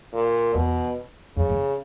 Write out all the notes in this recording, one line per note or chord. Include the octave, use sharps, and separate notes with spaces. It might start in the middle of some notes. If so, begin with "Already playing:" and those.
A#2
E2 B2
F2 C#3
F#2